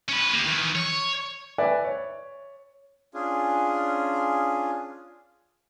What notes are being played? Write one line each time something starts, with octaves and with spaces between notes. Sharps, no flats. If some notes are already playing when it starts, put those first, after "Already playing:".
C#4 B4
A#3 G4
D#3 E3
C#5
B4 D5 E5 G#5
C#5
C#4 D4 F4 G#4